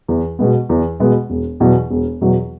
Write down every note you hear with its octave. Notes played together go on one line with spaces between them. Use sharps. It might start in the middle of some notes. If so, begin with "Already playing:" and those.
E2
B2 G#3 B3
E2
B2 G#3 B3
E1
E2 B2 F#3
E1
E2 B2 F#3